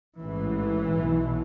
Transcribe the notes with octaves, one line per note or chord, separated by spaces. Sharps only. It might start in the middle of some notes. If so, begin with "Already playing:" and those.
A1 G#2 E3
B1 B2